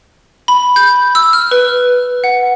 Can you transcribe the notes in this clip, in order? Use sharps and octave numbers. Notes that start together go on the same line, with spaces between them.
B5
G6
E6
F6
B4
F#5